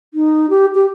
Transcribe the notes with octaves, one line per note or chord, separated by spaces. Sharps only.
D#4
G4
G4